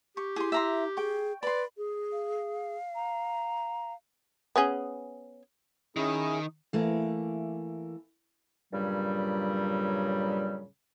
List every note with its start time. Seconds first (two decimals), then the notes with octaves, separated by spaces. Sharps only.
0.17 G4 C#6
0.36 E4 G#4 C6
0.52 E5 A#5 C6
0.97 G#4 G5 C#6
1.43 B4 D5 B5 C6
1.77 G#4
2.12 F5
2.95 A#5
4.56 B3 C#4 G#4
5.97 D#3 C#4 E4 G#4
6.73 E3 A3 A#3
8.72 G2 A#2 C#3 F#3 G3